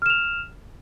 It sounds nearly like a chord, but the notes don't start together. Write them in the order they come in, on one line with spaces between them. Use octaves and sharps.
F6 E7 F7